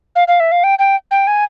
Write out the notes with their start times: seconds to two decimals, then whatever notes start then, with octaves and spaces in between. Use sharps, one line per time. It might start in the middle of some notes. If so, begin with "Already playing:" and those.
0.16 F5
0.28 F5
0.40 E5
0.52 F5
0.64 G5
0.79 G5
1.11 G5
1.27 G#5